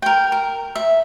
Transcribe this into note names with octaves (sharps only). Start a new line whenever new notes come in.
A#4 G5
A#4
E5